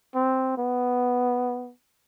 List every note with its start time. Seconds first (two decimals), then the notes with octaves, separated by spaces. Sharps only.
0.15 C4
0.58 B3